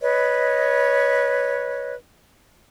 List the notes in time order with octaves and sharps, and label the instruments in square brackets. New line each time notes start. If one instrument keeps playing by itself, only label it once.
[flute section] B4 C#5 D#5